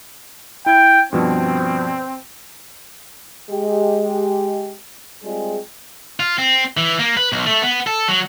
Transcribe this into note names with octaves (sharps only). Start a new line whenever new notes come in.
E4 G5 G#6
G2 B2 F3 C4
G#3 G4
G3 G#3 C4 F4 G#4
F4
C4
E3
A#3
B4
B1
A3
B3
A4
F#3